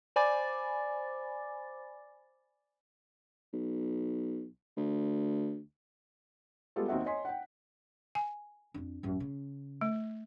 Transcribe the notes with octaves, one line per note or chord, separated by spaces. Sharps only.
C5 D5 G#5 B5 D6 A6
B1
D2
G3 G#3 B3 F4 G4 A4
D#2 C4 D#4 F#4 E5 F#5
C#5 D#5 G#5 C6 B6
F#5 G5
G#5
F2 D4
A1 F#2
C#3
A3